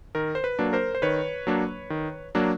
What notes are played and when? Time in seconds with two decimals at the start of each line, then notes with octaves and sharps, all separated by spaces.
0.15 D#3 A#4
0.35 C5
0.44 B4
0.59 F#3 A#3 D4
0.73 A#4 C5
0.95 C5
1.02 D#3 B4 C#5
1.47 F#3 A#3 D4
1.90 D#3
2.35 F#3 A#3 D4